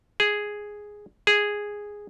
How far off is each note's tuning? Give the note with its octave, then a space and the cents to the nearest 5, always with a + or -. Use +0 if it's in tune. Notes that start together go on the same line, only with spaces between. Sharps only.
G#4 +0
G#4 -5